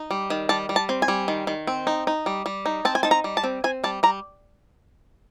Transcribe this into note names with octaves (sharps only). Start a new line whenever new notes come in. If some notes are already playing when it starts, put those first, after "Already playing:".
Already playing: D#4
G3
D#3
G3 A5
G3
A5
C4
G#5
G3
D#3
D#3
C4
D#4
D#4
G3
G3
D#4
C4 A5
G#5
D#4 A5
A#5
G3
A5
C4
C4 G#5
G3 A5
G3 A#5